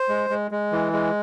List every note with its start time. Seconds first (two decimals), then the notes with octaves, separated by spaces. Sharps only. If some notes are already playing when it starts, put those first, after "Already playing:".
Already playing: C5
0.09 G#3
0.30 G#3
0.51 G#3
0.72 E3
0.93 G#3